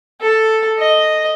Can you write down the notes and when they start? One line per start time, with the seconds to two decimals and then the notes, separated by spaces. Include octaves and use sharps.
0.22 A4
0.79 D#5